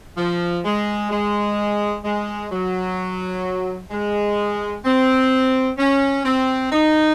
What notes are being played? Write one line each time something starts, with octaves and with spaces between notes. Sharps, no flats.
F3
G#3
G#3
G#3
F#3
G#3
C4
C#4
C4
D#4